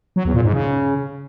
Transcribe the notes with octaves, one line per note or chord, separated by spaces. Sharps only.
F#3
E2
A#2
G#2
C#3